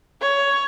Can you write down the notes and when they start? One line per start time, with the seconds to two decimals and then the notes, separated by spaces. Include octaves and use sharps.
0.21 C#5